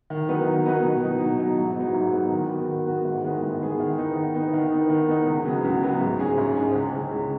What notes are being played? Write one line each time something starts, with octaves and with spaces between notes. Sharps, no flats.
D#3
F#3 B3 D#4 B4
D#3
F#3 B3 D#4 B4
B2
F#3 D#4
B2
F#3 D#4
G#2
F#3 B3 D#4
G#2
F#3 B3 D#4
D#3
B3 F#4
D#3
B3 F#4
G#2
D#3 G#3 B3 G#4
G#2
D#3 G#3 B3 G#4
D#3
B3 D#4
D#3
B3 D#4
D#3
B3 D#4
D#3
B3 D#4
C#2
C#3 F#3 B3
C#2
C#3 F#3 B3
G#2
G#3 C#4 G#4
G#2
G#3 C#4 G#4
C#2
C#3 G#3 C#4
C#2